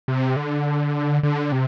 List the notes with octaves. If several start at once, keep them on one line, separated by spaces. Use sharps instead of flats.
C3
D3
D3
C3